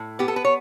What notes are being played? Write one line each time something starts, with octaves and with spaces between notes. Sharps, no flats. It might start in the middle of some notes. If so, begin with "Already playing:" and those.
Already playing: A2
B3 G4
A4
B4
C#5